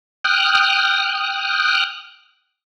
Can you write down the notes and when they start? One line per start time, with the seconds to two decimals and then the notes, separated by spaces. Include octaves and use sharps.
0.24 G5 D#6 F6 F#6